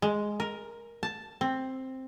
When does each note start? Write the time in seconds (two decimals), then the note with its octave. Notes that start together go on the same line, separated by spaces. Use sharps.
0.02 G#3
0.40 A#4
1.03 A5
1.41 C4